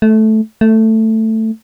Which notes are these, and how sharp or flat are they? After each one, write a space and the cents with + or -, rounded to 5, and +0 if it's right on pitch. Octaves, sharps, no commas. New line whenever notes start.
A3 -10
A3 +10